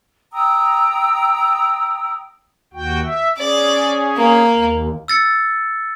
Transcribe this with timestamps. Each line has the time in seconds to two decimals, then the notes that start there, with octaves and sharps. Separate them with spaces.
0.33 G5 A#5 D#6 E6
2.74 D#2 F#4 G5
3.03 E5
3.38 C#4 G#4 D5
4.17 A#3
4.54 D#2
5.08 E6 A6 C#7